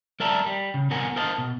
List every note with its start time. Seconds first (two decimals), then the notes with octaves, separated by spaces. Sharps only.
0.20 G3 A#4 D5 E5 A5 A#5
0.46 G3
0.74 C#3
0.90 C2 B3 A#4 F#5 G#5
1.16 A#4 C5 D#5 F5 A5
1.38 B2